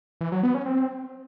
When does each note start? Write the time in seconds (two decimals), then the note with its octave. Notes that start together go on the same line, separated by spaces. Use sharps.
0.21 E3
0.32 F#3
0.43 B3
0.54 C#4
0.66 C4